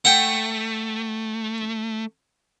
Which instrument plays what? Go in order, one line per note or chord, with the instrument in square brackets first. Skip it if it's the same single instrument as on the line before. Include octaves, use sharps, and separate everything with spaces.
[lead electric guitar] A3 [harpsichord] F#5 G5